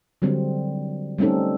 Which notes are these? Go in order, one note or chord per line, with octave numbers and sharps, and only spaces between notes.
D3 F#3 G3 C4
G3 A3 C4 C#4 D#4 A4